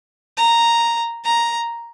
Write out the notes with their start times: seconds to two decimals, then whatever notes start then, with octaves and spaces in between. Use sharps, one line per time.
0.38 A#5
1.25 A#5